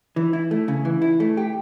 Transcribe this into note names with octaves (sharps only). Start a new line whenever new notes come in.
E3
E4
A3
C#3
E3
E4
A3
G4